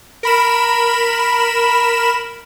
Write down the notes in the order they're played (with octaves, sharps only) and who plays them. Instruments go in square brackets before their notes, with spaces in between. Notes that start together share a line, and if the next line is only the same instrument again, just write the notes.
[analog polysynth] A#4 B5 E7